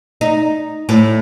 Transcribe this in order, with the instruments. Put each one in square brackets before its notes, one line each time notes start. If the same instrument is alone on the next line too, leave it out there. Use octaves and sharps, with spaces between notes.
[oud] D#4
A2